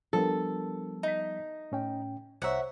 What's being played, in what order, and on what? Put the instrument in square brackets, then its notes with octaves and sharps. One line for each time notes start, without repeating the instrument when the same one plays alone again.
[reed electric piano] F3 G3 B3 [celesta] D4 A#4 [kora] A4
[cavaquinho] D#4 [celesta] E5 B6
[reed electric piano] A2 C#4 G5
[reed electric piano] C2 A#5 [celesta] C5 C#5 C#6 [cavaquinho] E5 F#5